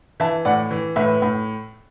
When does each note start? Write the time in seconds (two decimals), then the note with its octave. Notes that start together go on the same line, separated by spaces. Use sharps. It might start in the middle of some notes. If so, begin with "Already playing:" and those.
0.20 E3 E5 A5
0.45 A2 D5 F#5
0.71 E3
0.96 A2 B4 E5
1.22 A2